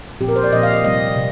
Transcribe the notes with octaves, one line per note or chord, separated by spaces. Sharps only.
A#2 F3 C4 G4
A#4
C5
D5
A#2 F3 C4 D#5
F5
D#5
C3 G3 C4 D#5
C3